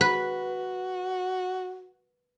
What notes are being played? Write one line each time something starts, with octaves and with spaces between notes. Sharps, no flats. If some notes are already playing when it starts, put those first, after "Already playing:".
F#4 B4